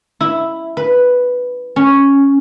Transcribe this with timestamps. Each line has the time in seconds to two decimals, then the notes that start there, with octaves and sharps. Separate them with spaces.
0.20 E4
0.77 B4
1.76 C#4